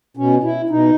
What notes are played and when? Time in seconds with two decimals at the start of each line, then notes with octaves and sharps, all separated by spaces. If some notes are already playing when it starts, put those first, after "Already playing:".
0.17 B2 C#4
0.43 E4
0.69 B2 D#4